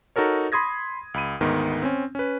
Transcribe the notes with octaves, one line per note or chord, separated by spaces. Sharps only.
D#4 F#4 A4 A#4 C#5
B5 C6 D#6 G#6 A#6
C#2 B5 D#7
D2 G#2 D#3 B3
C4 C#4
C#4 B4